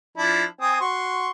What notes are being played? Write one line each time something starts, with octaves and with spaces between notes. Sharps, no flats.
F3 D4 E4
C4 G#5 D#6
F#4 C6 C#6